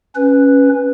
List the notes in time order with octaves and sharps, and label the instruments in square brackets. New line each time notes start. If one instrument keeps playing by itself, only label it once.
[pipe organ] C#4 B4